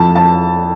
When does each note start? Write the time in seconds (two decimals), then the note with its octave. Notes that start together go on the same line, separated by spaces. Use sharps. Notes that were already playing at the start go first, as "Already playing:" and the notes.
Already playing: F2 F3 A5
0.15 A5